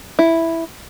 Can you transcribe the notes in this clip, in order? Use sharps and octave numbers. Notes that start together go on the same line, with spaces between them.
E4